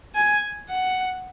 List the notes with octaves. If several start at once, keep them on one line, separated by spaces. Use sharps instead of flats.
G#5
F#5